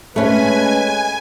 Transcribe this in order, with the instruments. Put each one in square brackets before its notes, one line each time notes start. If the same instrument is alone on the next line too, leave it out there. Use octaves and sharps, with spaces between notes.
[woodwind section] G#3 B4 [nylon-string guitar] A3 C#4 [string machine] G#5